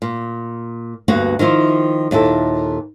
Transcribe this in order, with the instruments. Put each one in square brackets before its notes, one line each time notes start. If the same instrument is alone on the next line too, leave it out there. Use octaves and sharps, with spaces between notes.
[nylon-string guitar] A#2
D2 G2 A#3 B3 F#4 B4
D#3 F3 E4 F4
D#2 A#2 E4 A4